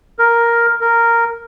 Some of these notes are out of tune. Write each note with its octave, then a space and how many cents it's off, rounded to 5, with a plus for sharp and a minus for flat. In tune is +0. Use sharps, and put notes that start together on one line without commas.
A#4 +5
A#4 -5